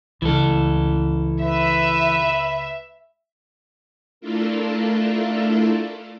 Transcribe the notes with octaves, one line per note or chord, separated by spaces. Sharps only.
C#2 E3 A4
B4 E5
A3 D4 E4 F4 A4 A#4